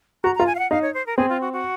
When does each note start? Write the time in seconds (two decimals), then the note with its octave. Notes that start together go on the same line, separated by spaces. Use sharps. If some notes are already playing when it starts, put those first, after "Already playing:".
0.24 F#4 A#5
0.35 F4 A#5
0.47 G#5
0.55 F5
0.59 F#5
0.71 D#4 F5
0.82 C#5
0.94 C5
1.06 A#4
1.17 C4 G#4
1.29 F4
1.41 F#4
1.53 F#4